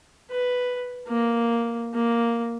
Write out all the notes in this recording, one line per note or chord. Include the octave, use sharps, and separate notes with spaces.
B4
A#3
A#3